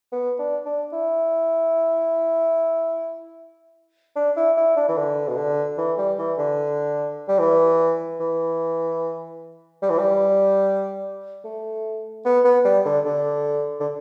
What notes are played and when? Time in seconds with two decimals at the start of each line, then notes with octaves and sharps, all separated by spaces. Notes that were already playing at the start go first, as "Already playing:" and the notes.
0.12 B3
0.39 D4
0.65 D4
0.93 E4
4.16 D4
4.36 E4
4.57 E4
4.77 D4
4.89 E3
4.97 D3
5.28 B2
5.37 D3
5.78 E3
5.98 G3
6.18 E3
6.38 D3
7.28 G3
7.39 E3
8.20 E3
9.82 G3
9.90 E3
9.98 G3
11.45 A3
12.25 B3
12.44 B3
12.65 G3
12.85 D3
13.05 D3
13.80 D3